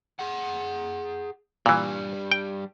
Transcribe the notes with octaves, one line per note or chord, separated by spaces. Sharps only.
G#4 F#5
G2 A#2 E3 G3
G5